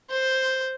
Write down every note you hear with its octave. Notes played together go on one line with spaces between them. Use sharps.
C5